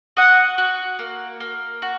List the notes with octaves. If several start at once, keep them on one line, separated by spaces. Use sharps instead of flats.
F#4 D#5 F#5
F#4
A#3
A#3
F#4